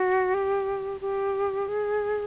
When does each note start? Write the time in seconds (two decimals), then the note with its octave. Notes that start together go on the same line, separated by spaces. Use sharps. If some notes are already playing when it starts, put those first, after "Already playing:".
Already playing: F#4
0.34 G4
1.01 G4
1.68 G#4